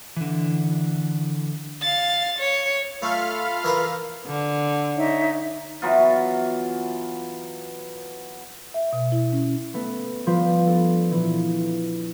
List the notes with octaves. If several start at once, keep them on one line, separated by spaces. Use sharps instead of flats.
D3 E3
F5 A6
C#5
A3 F4 A4 F5 B5 F6
E3 A#4 B4
D3
D#4 C#5 E5
E3 F#3 B3 F4
E5
B2
E4
C#4
A3 B3
F3 G3 F4 B4
B3 D4 A4
A#2 E3